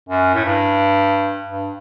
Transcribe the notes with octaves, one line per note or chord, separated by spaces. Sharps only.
F#2
A2
G2
G2